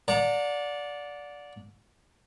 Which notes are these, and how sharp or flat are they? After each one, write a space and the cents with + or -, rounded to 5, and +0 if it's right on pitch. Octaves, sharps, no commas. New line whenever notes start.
D5 -10 F#5 -35 A#5 -40